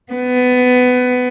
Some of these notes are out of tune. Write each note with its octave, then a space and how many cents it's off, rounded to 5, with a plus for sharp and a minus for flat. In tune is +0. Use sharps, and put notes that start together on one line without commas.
B3 +20